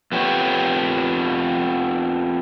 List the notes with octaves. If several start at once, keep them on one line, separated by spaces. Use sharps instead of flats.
F2 B3 G4 C#5